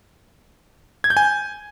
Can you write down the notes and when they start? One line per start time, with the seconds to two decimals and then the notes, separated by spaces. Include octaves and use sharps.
1.04 G#6
1.10 G6
1.17 G#5